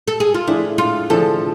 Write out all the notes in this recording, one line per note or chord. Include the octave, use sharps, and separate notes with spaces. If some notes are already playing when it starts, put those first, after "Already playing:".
A4
G#4
F4
A2 F3 A3 D4 E4 G#4
F4
A2 F3 A3 D4 G#4 A4